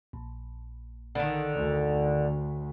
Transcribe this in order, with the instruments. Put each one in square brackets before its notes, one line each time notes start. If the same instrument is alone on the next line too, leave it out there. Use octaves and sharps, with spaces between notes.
[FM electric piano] A#1
[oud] D3 D#3
[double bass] D2